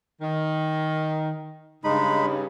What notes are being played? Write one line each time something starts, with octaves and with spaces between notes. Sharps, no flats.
D#3
G2 C#3 G#3 D#4 B5